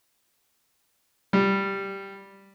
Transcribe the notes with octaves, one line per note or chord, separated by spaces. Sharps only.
G3